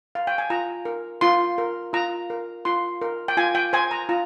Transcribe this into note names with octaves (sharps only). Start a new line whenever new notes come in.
F5
G5
G#5
F4 A#5
A#4
F4 C6
A#4
F4 A#5
A#4
F4 C6
A#4
G5
F4 G#5
G5
C5 G#5
A#5
F4 A#5